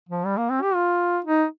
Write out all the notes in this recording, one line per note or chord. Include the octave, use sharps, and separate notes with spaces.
F3
G3
A#3
C4
G4
F4
D#4